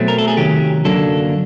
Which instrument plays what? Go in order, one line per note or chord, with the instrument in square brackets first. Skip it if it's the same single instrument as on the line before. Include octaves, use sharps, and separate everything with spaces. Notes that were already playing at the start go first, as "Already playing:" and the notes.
Already playing: [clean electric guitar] B2 F#3 A3 C4
A#4
A4
G#4
C3 D#3 F#3 G4
F#2 D3 F#3 A#3 D4 A4